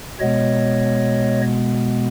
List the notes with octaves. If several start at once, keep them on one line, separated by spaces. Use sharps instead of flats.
B2 G#3 B3 C#5 D#5